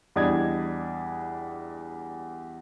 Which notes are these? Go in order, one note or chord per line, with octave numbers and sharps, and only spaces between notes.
E2 G3 D4 D#5 D#6 G#6